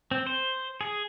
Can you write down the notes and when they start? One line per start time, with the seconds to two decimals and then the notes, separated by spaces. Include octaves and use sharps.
0.11 C4
0.27 C5
0.81 G#4